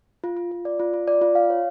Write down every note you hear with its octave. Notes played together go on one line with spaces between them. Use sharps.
F4
F4
F4
D5
F4
F4
D5
F4
F5
C#5